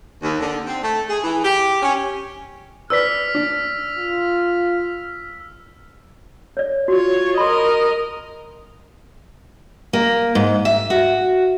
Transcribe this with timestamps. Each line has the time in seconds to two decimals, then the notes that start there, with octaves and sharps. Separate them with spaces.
0.22 D#2
0.40 D3
0.66 C4
0.82 A3
1.08 G#4
1.23 E3
1.43 G4
1.82 C#4
2.90 B4 D5 E6 F6 B6
3.35 D4
3.97 F4
6.57 C#5 D5
6.88 F4 F#4 C#5
7.38 A#4 D#5 B5 C6
9.93 A#3
10.35 G#2
10.65 E5
10.90 F#4